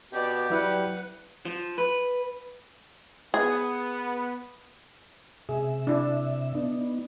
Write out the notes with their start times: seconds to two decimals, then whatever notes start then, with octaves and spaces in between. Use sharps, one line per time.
0.13 B2 G4 D5
0.50 F#3 G3 E4 B4 F#5
1.45 F3
1.78 B4
3.34 B3 G#4
5.49 C3 G#4 E5
5.87 D4 E4
6.54 B3 D4 D#4